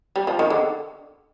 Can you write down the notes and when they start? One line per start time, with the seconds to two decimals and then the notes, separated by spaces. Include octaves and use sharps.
0.16 G3
0.27 F3
0.39 D#3
0.50 D3